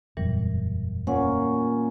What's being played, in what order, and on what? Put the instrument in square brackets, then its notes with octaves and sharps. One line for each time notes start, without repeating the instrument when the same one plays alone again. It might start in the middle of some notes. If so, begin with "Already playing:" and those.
[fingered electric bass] E1 F#2 [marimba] A#2 E3 G3
[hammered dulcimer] A#2 C#4 [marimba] F#5